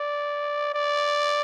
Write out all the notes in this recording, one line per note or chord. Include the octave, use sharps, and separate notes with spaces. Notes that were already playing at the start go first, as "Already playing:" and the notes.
Already playing: D5
D5